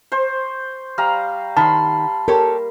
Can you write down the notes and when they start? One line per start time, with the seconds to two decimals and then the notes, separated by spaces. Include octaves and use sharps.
0.12 C5 C#6
0.98 G3 F5 A#5
1.57 D#3 A5 B5 C6
2.28 G4 A4 A#4 C#5